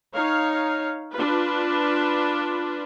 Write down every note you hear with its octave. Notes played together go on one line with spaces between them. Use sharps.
D#4 C#5 F5
D4 F4 B4